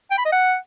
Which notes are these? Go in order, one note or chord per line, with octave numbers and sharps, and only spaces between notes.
G5
B5
D#5
F#5